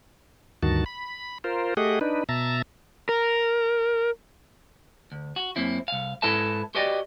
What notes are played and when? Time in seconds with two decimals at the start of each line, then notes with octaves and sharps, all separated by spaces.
0.63 D2 G2 D#3 F#4 A5
0.86 B5
1.44 F4 A#4 C5
1.77 A3 G4 G#4 D#5 F#5
2.01 D4 D#4 B4
2.29 B2 E5 A5 A#5
3.09 A#4
5.12 D2
5.36 F#4
5.56 F#2 A#3 C4 E4
5.88 C2 F5
6.22 G#2 E4 A4 B4 E5 A5
6.75 F#4 G4 B4 D5 D#5 G5